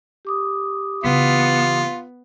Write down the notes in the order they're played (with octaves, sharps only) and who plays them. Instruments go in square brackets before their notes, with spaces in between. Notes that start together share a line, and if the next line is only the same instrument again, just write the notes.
[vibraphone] G4 D6 D#6
[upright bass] C#3 E3 [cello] B3 [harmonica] F4